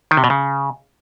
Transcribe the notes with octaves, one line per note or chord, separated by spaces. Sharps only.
D#3
C3
B2
C#3